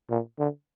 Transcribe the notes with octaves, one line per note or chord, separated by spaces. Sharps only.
A#2
D3